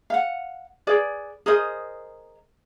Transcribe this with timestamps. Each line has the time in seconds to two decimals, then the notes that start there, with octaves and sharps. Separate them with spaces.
0.10 F5 F#5
0.87 G#4 B4 D5
1.46 G#4 A#4 C5 D#5